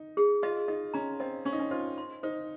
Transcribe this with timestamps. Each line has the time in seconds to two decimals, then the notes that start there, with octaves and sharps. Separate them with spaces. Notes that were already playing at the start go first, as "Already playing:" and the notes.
Already playing: D#4
0.17 G#4
0.43 F4 D#5
0.68 D#4 D#5
0.94 C#4 A#5
1.20 C4 D#5
1.45 C#4 C#6
1.53 D#4
1.59 C#4
1.71 F4 C5
1.98 C6
2.23 D#4 C5